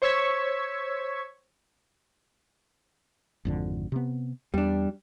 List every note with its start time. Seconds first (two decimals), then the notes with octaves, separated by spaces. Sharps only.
0.02 C5 C#5 C#6 E6 G#6 B6
3.45 G#1 F2 D3
3.92 C3 B3
4.54 E2 G3 D4